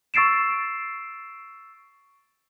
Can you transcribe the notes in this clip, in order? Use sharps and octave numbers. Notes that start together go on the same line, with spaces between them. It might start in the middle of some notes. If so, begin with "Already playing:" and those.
C#6 E6 A6 C7 D7 E7